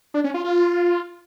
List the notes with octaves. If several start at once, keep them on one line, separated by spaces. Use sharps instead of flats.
D4
C#4
F4
F4